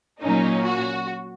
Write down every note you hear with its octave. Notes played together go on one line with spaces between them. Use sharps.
A#2 F#3 A#3 C#4 D#4
F#4